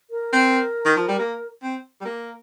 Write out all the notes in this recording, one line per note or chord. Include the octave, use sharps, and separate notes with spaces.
A#4
C4
D#3
F3
G3
A#3
C4
G3
A#3